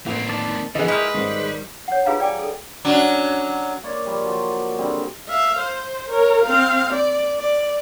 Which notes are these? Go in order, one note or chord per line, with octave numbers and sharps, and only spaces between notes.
A1 A#3 C4
D#3 D5 A5
D3 E3 F3 B3 G#4 D#5
G#3 E4 G4 A#4 B4
G#2 D#3 G3 C5
C#5 F#5
F4 G4 G#4 B4 F5 A#5
D5 G5 G#5 D6
G#4 A4
F#3 C#4 D4
A#3 C#5 D5
F3 G3
F3 F#3 F#4
D3 G3 C4 D#4
E5 F5
C5
A#4 C#5
C4 F5
D5
D5